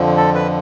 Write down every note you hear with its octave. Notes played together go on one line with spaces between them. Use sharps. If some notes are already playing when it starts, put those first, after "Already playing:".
Already playing: F2 D3 F3
A4
B4